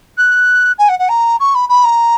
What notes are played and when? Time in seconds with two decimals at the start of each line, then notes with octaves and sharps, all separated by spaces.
0.17 F#6
0.78 G#5
0.88 F#5
0.99 F#5
1.08 A#5
1.39 C#6
1.54 B5
1.69 B5
1.84 A#5